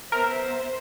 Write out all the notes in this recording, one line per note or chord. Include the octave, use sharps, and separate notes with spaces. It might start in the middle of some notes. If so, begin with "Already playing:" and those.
B3 A#4 C5 E5